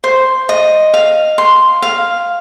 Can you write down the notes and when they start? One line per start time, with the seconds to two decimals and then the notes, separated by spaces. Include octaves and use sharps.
0.04 C5
0.49 D#5
0.94 F5
1.38 C6
1.82 F5